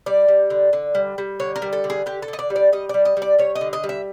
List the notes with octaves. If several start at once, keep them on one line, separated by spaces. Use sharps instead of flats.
G3 D5
G3
D3
D3
G3
G3
D3 C#5
A#4
G3
A4
D3
G#4
D3 G4
A4
D3
D#5
D5
G3
D5
G3 D#5
G3 D5
D#5
G3
D5
G3 C#5
D#5
D3
D#5
G3
E5